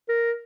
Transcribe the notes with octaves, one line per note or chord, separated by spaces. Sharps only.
A#4